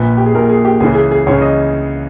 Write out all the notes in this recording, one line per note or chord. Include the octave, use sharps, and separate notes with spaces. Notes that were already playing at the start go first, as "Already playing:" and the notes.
Already playing: A#1 A#2 B4
G4
G#4
A#1 A#2 A#4
G#4
G4
C#2 C#3 E3 G#4
G#4
G#4
C#2 C#3 E3 C#5
D#5